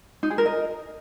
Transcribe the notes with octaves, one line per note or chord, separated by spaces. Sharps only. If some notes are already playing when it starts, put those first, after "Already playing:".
D#4
G#4
A#4
D#5